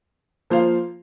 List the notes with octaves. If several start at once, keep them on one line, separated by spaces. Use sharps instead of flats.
F3 A#3 F4 C5 F5